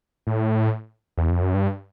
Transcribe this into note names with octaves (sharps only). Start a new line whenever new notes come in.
A2
E2
F2
F#2
G2